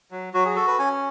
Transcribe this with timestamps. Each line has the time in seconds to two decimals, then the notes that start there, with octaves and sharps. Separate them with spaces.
0.11 F#3
0.34 F#3 F#4
0.45 G#4
0.56 F#4 A4
0.67 B4
0.79 C#4 G#5